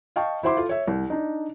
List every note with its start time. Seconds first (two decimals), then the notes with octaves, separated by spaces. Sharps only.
0.16 D#5 F5 G5 A5 C#6
0.43 E4 F#4 C5 E5 C6 D6
0.57 F4 A4
0.69 C#5 E5
0.87 C2
1.10 D4 D#4